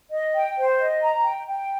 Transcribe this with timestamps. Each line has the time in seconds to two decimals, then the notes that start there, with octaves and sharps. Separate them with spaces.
0.11 D#5
0.35 G5
0.57 C5
0.80 D#5
1.02 A#5
1.24 G5
1.47 G5